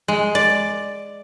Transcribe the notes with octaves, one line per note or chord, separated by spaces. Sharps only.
G#3
D5